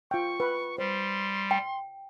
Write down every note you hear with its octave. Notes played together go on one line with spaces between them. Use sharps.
F4 G5 C#6
B4
G3 C5 C6
G5